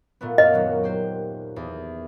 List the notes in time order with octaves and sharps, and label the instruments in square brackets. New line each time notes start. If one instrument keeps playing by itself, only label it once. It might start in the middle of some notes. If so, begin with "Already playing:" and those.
[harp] A#2 A3 B3
[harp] F#2 A#3 F6 [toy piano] D#5
[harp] D#1 F#3
G4 C5
E2